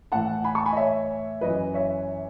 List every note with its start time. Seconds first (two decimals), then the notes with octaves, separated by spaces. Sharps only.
0.12 A2 E3 F#5 A5
0.44 G#5 B5
0.55 A5 C#6
0.66 G#5 B5
0.73 D#5
0.77 C#5 E5
1.41 F#2 E3 B4 D#5
1.74 C#5 E5